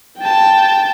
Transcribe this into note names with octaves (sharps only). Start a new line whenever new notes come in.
G5 A5